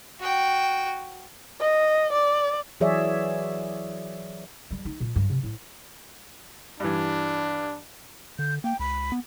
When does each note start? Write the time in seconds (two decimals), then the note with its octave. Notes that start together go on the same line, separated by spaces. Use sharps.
0.20 F#4 G5
1.60 D#5
2.12 D5
2.80 E3 F#3 G#4 C#5 D5 E5
4.71 G3
4.85 D#4
5.00 A#2
5.16 G2
5.30 C3
5.43 A2
6.80 G2 E3 D4
8.39 D3 G6
8.64 A#3 G5
8.79 C#2 B5
9.12 B3